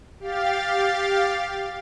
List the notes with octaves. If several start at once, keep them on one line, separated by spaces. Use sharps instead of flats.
G4 F5 A6